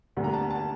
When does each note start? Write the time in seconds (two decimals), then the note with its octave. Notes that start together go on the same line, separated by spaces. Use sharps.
0.17 D2 D3 G3 A#3
0.24 A#5
0.33 A5
0.50 A5